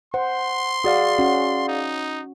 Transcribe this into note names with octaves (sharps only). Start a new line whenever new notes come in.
C5 F#5 C6
F#4 G#4 D5 F5
C#4 F#4
D#4